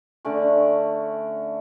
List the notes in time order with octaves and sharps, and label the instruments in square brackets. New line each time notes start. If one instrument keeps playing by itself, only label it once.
[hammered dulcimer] D3 A3 C#4 D5